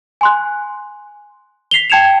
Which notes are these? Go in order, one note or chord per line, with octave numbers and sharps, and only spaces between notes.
G#5 C6 F#6
B6 C7 F7 G7
G5 A5 G#6 C#7 E7 F7